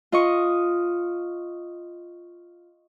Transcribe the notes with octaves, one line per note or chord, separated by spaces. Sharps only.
F4 D#5 C#6